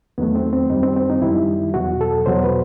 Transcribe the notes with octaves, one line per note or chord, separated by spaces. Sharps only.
E2 D#3 F#3 A3 B3
C4
C4
F#2 D#3 G3 D#4
C4
C4
D#4
F#2 D#3 G3 E4
E2 B2 F#3 F#4
A4
E2 B2 F#3 C5
B4